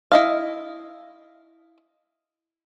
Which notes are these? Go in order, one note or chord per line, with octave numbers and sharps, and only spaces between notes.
E4 D#5 F5